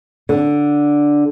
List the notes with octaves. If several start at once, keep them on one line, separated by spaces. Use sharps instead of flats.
D3